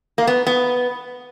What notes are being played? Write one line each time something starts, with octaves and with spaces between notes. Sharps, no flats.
A#3
B3
B3